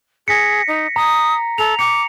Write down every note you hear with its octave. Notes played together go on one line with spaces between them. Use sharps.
G#4 A#6 B6 C#7
D#4
A#5 D#6
A4 F7
D6 C#7